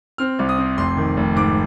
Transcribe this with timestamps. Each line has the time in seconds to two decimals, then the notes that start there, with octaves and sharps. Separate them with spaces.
0.18 C4 F6
0.39 C2
0.49 D#6
0.58 C4
0.78 F1 C6
0.97 D#3
1.17 F1
1.36 G#2 D6